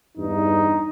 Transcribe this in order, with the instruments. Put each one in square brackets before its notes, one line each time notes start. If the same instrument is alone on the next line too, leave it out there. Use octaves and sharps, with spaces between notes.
[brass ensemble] E2 G2 [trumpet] D#4